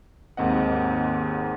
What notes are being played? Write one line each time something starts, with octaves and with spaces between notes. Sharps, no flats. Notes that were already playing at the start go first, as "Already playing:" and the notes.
D#2 G#2 C4 D#5 F#5